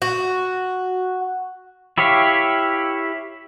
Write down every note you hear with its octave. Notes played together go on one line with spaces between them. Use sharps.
F#4
E4 G4 C#5 E5 F5